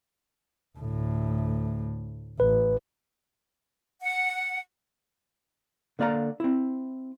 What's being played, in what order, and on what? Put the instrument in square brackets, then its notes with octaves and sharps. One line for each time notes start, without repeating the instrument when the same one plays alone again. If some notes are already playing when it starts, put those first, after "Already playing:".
[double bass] D2 A2
[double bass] A1 [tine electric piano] B4
[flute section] F#5
[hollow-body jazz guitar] D3 A#3 D5 F5 A#5
C4 E4